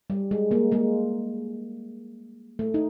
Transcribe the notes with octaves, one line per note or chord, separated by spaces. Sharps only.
G3
G#3
G#3 A#3
G#3 A#3
A3
D#4